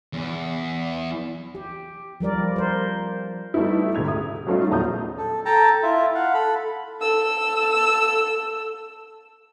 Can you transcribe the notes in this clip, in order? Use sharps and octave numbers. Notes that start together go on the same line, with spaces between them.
E2
G4
F3 G3 A#4 D5
A#4 C5
G3 A3 B3 D#4 E4
F#1 D2 G#2 G#6 F7
D#6
F#3 G3 A3 C#4 D#4 F4
A#1 E2 A5 A#5 D#6 G6
A4
A4 G5 A5 A#5
E4 F4 E5
F5 F#5
A4 B5
A4 E6